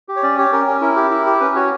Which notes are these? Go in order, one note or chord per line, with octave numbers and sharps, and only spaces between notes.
G4
C#5
C#4 D5
G4 C#5
C#4 A#4
C#4
E4 A#4
G4
E4
G4
C#4 B4
F#4 C#5